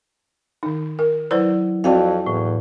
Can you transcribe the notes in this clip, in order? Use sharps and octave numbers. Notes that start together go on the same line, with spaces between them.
D#3 D#4
A#4
F#3 E4 B4 C5 D5
F2 C4 F#4 D5 F5 G5 A5
E2 A2